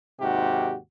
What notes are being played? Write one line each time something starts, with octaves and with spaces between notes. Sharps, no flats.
D#2 G#2 C3 F#4 G4